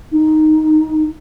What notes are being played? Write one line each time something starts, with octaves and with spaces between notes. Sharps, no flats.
D#4